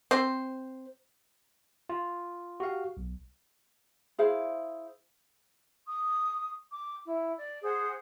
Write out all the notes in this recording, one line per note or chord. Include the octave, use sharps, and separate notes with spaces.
C4 C5
F4
F#4 G4 F5
B1
E4 G#4 C5 F5
C#6 D#6
D6
E4
D5
G#4 C5 F#5 D#6